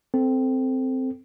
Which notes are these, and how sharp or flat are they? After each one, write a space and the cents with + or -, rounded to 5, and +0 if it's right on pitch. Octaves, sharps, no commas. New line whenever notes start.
C4 -10 A4 +0